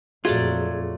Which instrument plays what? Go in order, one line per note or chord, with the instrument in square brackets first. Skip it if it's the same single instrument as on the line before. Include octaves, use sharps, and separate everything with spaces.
[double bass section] F2 A#2 [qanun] F#3 A3 D5 [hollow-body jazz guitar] F4 [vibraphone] G#4